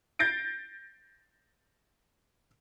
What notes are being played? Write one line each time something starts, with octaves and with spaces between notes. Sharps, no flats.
G6 A6 A#6 C7 D7